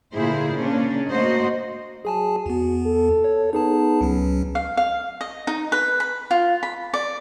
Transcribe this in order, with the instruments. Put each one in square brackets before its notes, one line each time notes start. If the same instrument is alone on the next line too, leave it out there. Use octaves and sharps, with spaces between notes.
[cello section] A#2 D3 E4 F4 G#4 C5
C#3 A#3 C#4 D4
A3 A#3 F#4 C5 D#5
[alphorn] F#3 [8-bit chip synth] G#4 G#5 A5
[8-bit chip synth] E2 B3 [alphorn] F#4
[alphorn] A4
[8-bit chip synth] C#5
[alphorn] B3 [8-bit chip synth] D#4 G#4 A5
[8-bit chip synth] C#2 F#3 C#4
[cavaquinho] F5
F5
D#5
D#4
B4
B5
F4
B5
D5